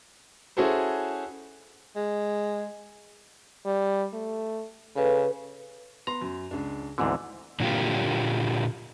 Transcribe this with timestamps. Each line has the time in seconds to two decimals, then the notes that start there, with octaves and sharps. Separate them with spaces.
0.57 C#4 E4 F#4 G#4 A4 C5
1.96 G#3
3.66 G3
4.14 A3
4.96 C#3 A4 B4
6.07 B3 A#5 C6
6.21 F#2
6.51 C#2 D4
6.98 D2 G#2 D3 E3 B3 C4
7.60 A#2 D3 F#3 A#3 F4 G4